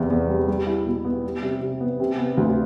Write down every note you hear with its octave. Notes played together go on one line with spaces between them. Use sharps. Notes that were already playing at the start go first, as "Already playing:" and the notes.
Already playing: E2 C3
E2
G3
G3
E4
B2
B3
G3
C3
C3
B3
C3
B3
D2